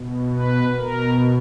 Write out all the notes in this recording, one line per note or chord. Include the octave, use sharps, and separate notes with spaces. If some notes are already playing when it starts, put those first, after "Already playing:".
Already playing: B2
B4
B2 A#4